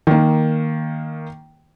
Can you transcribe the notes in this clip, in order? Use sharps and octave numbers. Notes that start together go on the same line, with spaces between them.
D#3 A#3